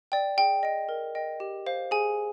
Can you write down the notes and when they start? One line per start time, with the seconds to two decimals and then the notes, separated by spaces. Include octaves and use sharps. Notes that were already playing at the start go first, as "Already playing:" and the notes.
0.12 D5 G5
0.37 G#4 G5
0.63 D#5 G5
0.89 A#4
1.15 D#5 G5
1.40 G4
1.66 C5 F5
1.91 G#4 G#5